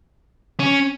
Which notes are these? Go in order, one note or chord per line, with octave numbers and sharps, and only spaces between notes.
C#4